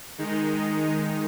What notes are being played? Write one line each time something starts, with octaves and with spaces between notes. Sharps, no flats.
D#3 G#3 D#4